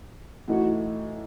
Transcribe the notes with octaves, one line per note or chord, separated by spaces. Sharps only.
A2 E3 A3 D#4 F#4